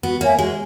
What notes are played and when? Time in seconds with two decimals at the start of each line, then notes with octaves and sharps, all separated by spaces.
0.03 B3 F#4
0.21 A#3 C#5 E5 G#5
0.38 G#3 F#4